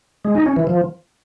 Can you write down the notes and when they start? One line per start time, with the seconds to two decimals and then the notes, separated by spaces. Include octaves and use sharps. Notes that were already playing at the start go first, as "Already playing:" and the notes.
0.25 G#3
0.35 D#4
0.46 C#4
0.56 E3
0.67 F3